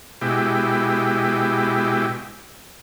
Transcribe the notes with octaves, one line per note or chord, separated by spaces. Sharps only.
B2 G#3 E4 G4